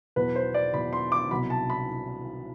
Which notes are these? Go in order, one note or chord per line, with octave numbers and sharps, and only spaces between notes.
E2 B2 F#3 B4
C5
D5
E2 B2 F#3 B5
C6
D6
C2 B2 F#3 B5
A5
B5